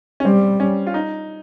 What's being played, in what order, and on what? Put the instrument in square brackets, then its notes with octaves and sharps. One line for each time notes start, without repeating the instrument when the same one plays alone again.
[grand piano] C#4
[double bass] G3 [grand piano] C4
[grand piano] C#4
F4
D#4